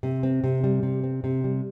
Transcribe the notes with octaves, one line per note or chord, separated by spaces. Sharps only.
C3
C4
C3
G3
C3
C4
C3
G3